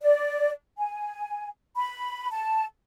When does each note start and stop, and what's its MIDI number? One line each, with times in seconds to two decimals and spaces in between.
0.02 0.51 74
0.78 1.49 80
1.77 2.30 83
2.32 2.65 81